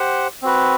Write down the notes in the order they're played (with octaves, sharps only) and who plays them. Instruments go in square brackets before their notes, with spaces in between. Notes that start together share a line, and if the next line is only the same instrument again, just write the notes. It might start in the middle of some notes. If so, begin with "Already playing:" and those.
Already playing: [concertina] G4 C5 F#5
C4 F#4 B4